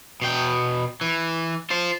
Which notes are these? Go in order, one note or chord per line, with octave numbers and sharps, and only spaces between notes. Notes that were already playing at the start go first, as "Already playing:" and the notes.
B2 G5
E3
F4 C5